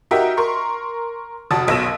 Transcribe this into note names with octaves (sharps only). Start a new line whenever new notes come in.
D#4 F#4 G4 A#4 E5
A#4 C6 C#6
F1 F#4 A5 D#6
F#1 B1 B2 E6 A#6 E7